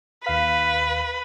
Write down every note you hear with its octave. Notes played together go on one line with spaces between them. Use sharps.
D#2 B4 F5 B6